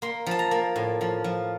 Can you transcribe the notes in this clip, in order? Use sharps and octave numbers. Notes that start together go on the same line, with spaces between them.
A#3 C6
F3 A5
A#5
A#3
A2
F3
F3